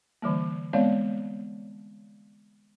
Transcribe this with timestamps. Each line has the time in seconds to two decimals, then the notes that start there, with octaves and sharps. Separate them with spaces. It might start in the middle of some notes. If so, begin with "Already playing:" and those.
0.22 D3 E3 G3 A#3
0.73 G#3 B3 C4 C#5 D5 F5